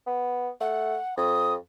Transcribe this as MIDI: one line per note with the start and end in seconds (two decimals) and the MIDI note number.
0.07 0.49 59
0.61 0.96 57
0.61 1.14 78
1.17 1.56 41
1.17 1.53 87